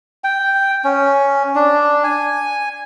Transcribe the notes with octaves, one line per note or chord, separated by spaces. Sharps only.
G5
C#4
D4
G#5